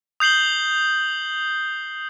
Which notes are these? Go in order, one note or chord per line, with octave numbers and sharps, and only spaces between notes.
D#6 G6 C7 F#7 G7